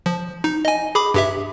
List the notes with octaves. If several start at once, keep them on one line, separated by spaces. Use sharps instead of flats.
F3
D#4
D#5 G#5
G#4 B5 D6
G2 G4 E5